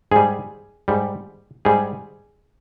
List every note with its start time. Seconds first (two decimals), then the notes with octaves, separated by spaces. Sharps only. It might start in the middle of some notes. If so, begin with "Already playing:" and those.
0.12 G#2 G3 G#4
0.88 G#2 G3
1.65 G#2 G3 G#4